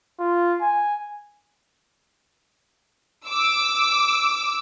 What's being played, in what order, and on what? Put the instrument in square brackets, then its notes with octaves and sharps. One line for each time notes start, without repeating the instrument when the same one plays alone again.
[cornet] F4
G#5
[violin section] D6 E6